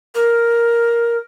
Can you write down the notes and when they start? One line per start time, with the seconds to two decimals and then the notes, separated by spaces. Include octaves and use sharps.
0.15 A#4